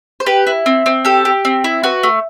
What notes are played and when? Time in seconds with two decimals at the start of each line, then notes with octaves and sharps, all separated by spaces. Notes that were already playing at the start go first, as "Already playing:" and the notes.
0.20 C5
0.26 G4 B4
0.47 E4
0.66 C4
0.86 C4
1.05 G4 A4
1.25 G4
1.45 C4
1.64 E4
1.84 F#4 B4
2.03 A3